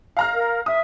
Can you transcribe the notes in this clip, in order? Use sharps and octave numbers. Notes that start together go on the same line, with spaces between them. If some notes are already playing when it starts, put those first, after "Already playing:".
F5 A#5 F6
A#4
E5 D#6